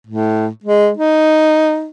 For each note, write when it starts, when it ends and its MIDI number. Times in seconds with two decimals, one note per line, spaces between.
0.07 0.48 45
0.64 0.91 56
0.97 1.88 63